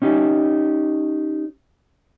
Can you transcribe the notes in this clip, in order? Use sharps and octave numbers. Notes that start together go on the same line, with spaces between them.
C#4 D#4 G4